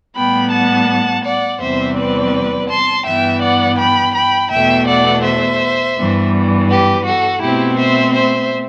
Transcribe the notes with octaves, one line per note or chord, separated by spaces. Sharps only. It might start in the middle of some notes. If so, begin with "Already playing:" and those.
A2 G3 B3 G5 B5
F#5 A5
D5 F#5
E2 C3 G3 C4 C5 E5
B4 D5
A5 C6
G2 E3 B3 E5 G5
D5 F#5
G5 B5
G5 B5
E2 B2 A3 E5 G5
D5 F#5
C5 E5
G2 E3 G3 B3
G4 B4
F#4 A4
B2 A3 C4 E4 G4
C5 E5
C5 E5